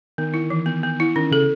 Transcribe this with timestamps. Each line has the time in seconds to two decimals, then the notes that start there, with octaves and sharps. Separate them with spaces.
0.18 D#3 B3
0.34 E4
0.50 E3
0.66 B3
0.83 B3
1.00 E4
1.16 D#3 C#4
1.31 C#3 A4